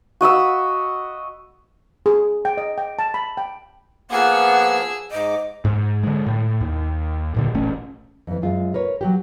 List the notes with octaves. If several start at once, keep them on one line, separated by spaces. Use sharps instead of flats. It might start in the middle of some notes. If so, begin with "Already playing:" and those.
F#4 D#5 B5 E6
G#4
G5
D#5
G5
A5
B5
G5
F3 A#3 B3 G#4 F#5 E6
G#2 D#5 D6
G#2
D3 G#3
A2
D#2
D#1 A#2 D3
E1 A1 A3 C#4
F2 E3
F#2 G#3 F4
A#4 B4 C#5
F#3 F#4 G4